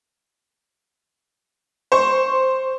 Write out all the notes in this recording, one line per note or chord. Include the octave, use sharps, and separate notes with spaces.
C5 C#6